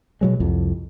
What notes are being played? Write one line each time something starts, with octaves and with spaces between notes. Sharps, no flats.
B2 F#3 G#3
C2 F2